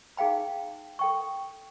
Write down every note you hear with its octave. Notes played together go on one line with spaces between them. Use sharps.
D#4 G#4 F5 G5 B5
A4 G5 C#6